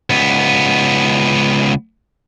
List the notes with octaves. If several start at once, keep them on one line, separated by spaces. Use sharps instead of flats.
C#2 B3